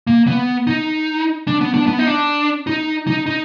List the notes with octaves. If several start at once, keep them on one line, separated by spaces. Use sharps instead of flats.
A#3
B3
D#4
D4
B3
D4
B3
D#4
D4
D#4
D#4
D#4